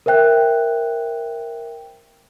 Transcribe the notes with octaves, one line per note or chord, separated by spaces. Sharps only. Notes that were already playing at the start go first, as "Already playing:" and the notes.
A#4 C5 E5 G5 F#6